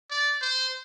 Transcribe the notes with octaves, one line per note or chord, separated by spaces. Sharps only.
D5
C5